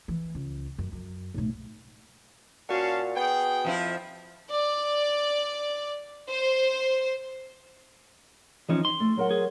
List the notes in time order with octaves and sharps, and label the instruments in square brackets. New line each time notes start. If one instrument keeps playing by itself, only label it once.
[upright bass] E3
C#2
F#2
F#2
B1 A2
[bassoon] A#2 [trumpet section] C#4 F5 A5 [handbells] F#4 F#5
[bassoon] B3 [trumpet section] G#4 G5
[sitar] F2 F3 E4
[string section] D5
C5
[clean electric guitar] E3 F3 C#4 [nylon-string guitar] D#4 C5 D#5
[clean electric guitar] C6
[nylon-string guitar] A3
F#3 A#4 F#5
[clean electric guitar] G#4